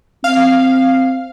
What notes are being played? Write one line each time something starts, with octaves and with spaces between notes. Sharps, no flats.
C4 F5